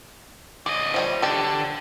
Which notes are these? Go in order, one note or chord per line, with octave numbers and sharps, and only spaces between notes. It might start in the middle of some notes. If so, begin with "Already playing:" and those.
D3 G#4 D#5
F3 G3 C#5
D3 G4 D5